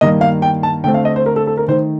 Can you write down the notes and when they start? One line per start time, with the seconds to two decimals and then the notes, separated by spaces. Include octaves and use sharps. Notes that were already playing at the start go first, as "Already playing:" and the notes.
0.01 G2 D#3 A#3 D#5
0.21 F5
0.42 G5
0.63 A5
0.84 D3 A3 C4 G5
0.94 F5
1.05 D#5
1.16 C5
1.26 A#4
1.36 A4
1.47 A4
1.57 A#4
1.68 D#3 A3 D#4 C5